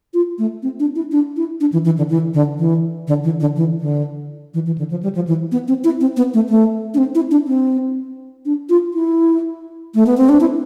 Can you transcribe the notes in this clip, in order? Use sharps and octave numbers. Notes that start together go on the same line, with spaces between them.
F4
A3
C4
D4
E4
D4
E4
D4
E3
E3
D3
E3
D3
E3
D3
E3
D3
E3
D3
E3
E3
D3
F3
G3
F3
E3
B3
C4
E4
C4
B3
A3
A3
D4
C4
E4
D4
C4
D4
F4
E4
A3
B3
C4
D4
E4